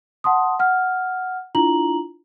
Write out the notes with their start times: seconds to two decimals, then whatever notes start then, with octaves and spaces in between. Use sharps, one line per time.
0.24 F#5 A5 C6 D#6
0.59 F#5 F6
1.55 D4 E4 F4 A#5 F#7